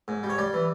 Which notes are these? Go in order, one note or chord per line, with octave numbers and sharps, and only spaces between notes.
G#2
G3
C#5
G3 D5
E3